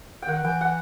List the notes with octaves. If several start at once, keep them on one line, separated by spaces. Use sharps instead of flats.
G5
D#3 F#5
E3 G5
F#5